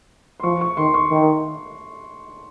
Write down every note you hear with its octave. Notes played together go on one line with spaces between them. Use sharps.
C6
F3 C#6
C#6
D#3 C6
C#6
D#3